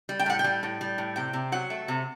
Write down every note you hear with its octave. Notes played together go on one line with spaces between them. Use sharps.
G3
G5
A2 F#5
G5
G3
A2
G3
A2
C3 G5
C3
F#3 F#5
A3
C3